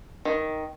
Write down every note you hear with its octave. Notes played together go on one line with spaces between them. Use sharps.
D#3